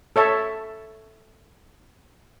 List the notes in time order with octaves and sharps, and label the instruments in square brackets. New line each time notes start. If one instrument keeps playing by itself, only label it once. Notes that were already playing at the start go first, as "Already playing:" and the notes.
[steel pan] A4 C#5 E5 A5